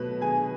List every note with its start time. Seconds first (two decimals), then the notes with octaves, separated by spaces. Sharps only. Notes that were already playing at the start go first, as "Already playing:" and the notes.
Already playing: B2 F#3 A3 B4
0.21 G#4 G#5